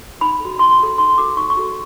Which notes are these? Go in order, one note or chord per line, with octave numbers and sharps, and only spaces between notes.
D#4 B5
F#4 A4
D#4 C6
F#4 A4
D#4 C6
F#4 A4 D6
D#4 C#6
C#6
F#4 A4